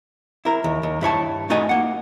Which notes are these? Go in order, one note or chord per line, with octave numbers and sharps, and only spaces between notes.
E4 A#4
D#2
D#2
G2 E4 C#5 A5
A3 D#4 F#4 D#5 G#5
A#3 F#5